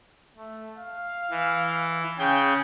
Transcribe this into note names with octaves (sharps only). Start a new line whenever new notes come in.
A3
F5
E3
C#3 G#4 G5 G6